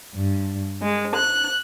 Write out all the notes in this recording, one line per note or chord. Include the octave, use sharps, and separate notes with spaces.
G2
G#3
F#6